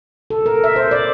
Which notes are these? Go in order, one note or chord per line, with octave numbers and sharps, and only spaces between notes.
A4
A#4
E5
C5
D5